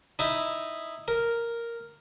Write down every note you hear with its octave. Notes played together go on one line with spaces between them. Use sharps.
D#4 E4
A#4